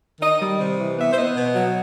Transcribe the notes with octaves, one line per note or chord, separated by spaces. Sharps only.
D#3 D#5
G3
C3
E3
B3 E5
C5
B3 D#5
B2
F#3